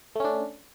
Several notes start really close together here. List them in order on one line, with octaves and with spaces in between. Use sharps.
A3 C#4 D4